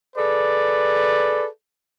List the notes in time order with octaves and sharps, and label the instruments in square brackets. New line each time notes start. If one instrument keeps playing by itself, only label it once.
[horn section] G#4 A4 B4 D5